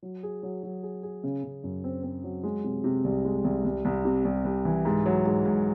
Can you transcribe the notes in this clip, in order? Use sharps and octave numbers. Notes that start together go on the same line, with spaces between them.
F#3
G#4
F#3
F#3
G#4
G#4
C#3
C#3
F#2
C4
C4
F#3
G#3
C3
C3
C2
G#3
C2
C2
C2
C3
C2
C2
E3
G#2
F#3
G#2
G#2